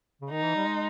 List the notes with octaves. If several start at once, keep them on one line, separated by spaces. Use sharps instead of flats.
C#3
D#3 D#4
E3
G3
G#3